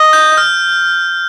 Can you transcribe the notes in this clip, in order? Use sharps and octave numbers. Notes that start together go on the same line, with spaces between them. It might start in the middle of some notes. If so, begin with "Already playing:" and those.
Already playing: D#5
G6
F6